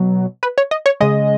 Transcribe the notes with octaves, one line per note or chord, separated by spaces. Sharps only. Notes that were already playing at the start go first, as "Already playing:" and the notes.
Already playing: B2 F#3
B4
C#5
D#5
C#5
C#3 G#3 D#5